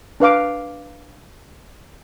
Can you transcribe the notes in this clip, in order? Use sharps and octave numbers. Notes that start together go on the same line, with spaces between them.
D4 B4 F5 D6